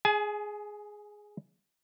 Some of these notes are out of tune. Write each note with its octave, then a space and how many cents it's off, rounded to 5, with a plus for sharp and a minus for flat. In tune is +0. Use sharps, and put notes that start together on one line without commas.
G#4 +0 G#5 +35